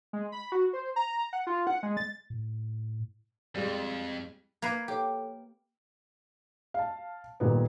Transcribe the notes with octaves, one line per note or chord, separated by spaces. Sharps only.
G#3
B5
F#4
C5
A#5
F#5
F4
F#5
G#3
A6
A2
F2 G3 G#3
A#3 B4 G#6 A#6 C7
G4 A4 C#5
F5 A5
D#1 A#2 B3